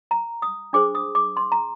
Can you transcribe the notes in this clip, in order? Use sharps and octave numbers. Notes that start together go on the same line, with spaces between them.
A#5
D#6
D4 G#4 C5 D6
D#6
D6
C6
A#5